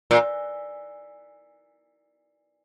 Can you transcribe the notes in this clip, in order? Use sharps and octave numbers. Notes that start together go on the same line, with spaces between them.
A#2